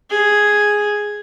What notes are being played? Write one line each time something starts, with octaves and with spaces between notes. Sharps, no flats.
G#4